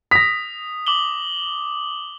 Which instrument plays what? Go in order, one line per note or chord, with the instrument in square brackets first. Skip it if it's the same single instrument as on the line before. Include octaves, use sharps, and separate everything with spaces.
[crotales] D#6 [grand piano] A#6 B6
[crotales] D6 F#7 G7